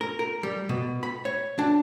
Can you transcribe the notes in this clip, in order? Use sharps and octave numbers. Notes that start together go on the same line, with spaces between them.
A#4
A#4
G3
B2
B5
C#5
D4